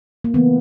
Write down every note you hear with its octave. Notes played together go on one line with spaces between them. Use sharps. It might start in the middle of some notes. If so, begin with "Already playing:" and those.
A#3
C#3 E3 A3 B3